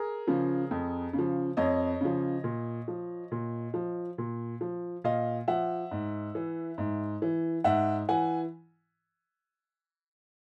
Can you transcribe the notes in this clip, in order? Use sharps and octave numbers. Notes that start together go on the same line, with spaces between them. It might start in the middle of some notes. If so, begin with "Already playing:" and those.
Already playing: G#4 A#4
C#3 F3
F2
C#3
F3
F2 C#5 D#5
C#3 F3
A#2
F3
A#2
F3
A#2
F3
A#2 D#5 F5
F3 E5 F#5
G#2
E3
G#2
E3
G#2 E5 F#5
E3 F#5 G#5